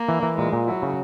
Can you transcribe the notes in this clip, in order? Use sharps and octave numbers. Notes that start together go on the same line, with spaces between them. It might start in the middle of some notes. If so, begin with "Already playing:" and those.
Already playing: A#3
E3
E3
A#2 G#3
A#2
F#3 E4
C#3